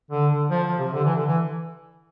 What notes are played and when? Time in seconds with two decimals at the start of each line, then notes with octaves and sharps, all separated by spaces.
0.11 D3
0.30 D3
0.50 F3
0.64 F3
0.79 C3
0.93 D3
1.04 E3
1.15 D3
1.26 E3